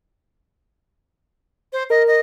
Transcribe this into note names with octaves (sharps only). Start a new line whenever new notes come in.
C5
A#4 D#5
D#5